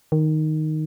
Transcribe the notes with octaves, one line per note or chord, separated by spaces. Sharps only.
D#3